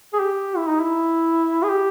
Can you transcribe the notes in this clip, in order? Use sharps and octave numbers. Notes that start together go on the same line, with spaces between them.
G#4
G4
E4
D#4
E4
G#4
G4